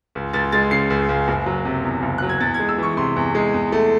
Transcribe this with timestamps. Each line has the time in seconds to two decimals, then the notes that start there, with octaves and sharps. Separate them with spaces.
0.15 C#2
0.33 C#2 A6
0.52 G#3 A6
0.71 C#3 C7
0.90 C#2
1.09 C#2
1.28 F#1
1.46 F#3
1.65 C3
1.84 E2
2.03 F#1
2.18 F#3 F#6
2.29 G#6
2.40 E2 A6
2.54 G#6
2.59 G#3
2.69 E6
2.78 E3 C#6
2.97 C3 C6
3.16 E2
3.35 G#3
3.54 E2
3.72 A3